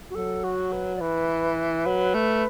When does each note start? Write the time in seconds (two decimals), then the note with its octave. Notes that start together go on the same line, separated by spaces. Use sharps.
0.10 F#4
0.15 F#3 A4
0.44 F#4
0.72 B4
0.96 D5
1.01 E3 B4
1.86 F#3
2.14 A3